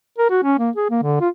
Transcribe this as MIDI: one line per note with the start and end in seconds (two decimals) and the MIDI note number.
0.18 0.30 70
0.30 0.39 66
0.43 0.56 61
0.59 0.70 58
0.76 0.88 68
0.90 0.99 58
1.03 1.18 50
1.21 1.29 65